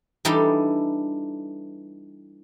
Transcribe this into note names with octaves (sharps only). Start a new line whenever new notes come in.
E3 G3 D4 D#4 A4 G5